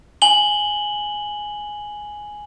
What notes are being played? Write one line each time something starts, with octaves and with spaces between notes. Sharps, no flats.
G#5 F#7 G7